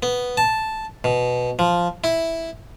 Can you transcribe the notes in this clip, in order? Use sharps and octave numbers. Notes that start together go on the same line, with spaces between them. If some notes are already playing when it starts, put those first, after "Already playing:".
B3
A5
B2
F3
E4